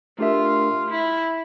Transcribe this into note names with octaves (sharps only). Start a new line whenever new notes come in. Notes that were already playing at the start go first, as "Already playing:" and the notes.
A3 D4 F4 G4 A#4 E5
E4